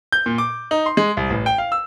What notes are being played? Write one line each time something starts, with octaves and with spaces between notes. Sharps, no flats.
G6
A#2
D6
D#4
C6
G#3
C2
A1
G5
F5
E6